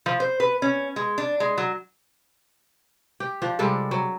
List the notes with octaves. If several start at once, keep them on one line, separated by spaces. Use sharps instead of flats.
F3
C5
B4
C#4
G#3
D4
G#3
F#3
G4
F3 D4
C3 G3 G#3 A4
F#3